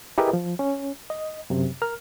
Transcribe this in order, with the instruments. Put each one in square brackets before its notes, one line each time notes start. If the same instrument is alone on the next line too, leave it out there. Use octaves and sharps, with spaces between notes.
[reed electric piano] E4 G4 G#4 A#4 B4 D#5
F3
C#4
D#5
F#2 C3
A#4 F6